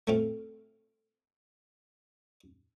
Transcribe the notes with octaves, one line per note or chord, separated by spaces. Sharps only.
A3 C4 F4